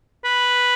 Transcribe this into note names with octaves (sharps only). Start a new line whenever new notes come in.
B4